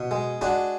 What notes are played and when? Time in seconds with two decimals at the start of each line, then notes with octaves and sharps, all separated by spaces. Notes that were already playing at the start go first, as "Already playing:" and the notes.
Already playing: B2
0.11 G#3
0.41 G#3 D4 F#4